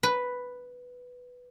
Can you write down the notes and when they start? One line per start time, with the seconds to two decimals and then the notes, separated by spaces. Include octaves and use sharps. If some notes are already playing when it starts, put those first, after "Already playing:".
0.03 B4